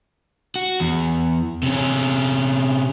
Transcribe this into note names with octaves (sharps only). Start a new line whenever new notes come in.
F#4
E2
C3 C#4